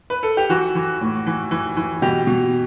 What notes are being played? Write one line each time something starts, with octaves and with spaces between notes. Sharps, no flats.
B4
A4
G4
E3 F#4
E3
A2
E3
E3
E3
B2 G4
B2